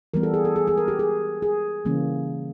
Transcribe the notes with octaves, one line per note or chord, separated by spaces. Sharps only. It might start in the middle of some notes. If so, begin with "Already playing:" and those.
E3 G3 B3 A#4
A4
G#4
A4
G#4
G#4
A#4
G4
G#4
G#4
C#3 E3 G3 A#3 C#4